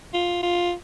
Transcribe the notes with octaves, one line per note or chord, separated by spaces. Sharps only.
F4
F4